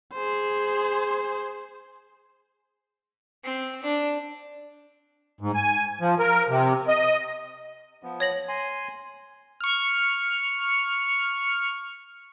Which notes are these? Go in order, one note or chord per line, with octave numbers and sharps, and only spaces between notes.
G#4 C5
C4
D4
G#2
G#5
F3
A#4
C3
D#5
F3 B3
C#5 A#6 F#7
G#5 C6
C#6 F6